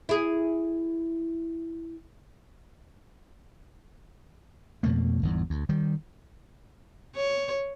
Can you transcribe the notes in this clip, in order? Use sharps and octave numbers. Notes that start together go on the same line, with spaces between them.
E4 G#4
F2 B2 A3 A#3
G1 E2 G#2
D2
D#3 G3
C#5